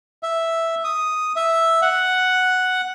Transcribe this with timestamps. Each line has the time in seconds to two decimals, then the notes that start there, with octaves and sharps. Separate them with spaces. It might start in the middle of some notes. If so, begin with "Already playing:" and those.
0.23 E5
0.84 D#6
1.36 E5
1.82 F#5